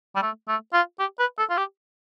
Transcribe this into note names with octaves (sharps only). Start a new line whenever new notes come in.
G3
A3
A3
F4
G4
B4
A4
F4
G4